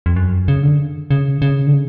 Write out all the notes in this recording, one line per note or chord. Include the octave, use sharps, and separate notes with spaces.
F2
F#2
C#3
D3
C#3
C#3
D3
C#3